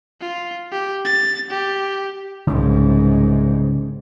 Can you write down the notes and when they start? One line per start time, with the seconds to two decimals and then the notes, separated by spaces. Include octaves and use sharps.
0.21 F4
0.72 G4
1.05 A6
1.50 G4
2.47 C2 G#2 C#3 G#3 B3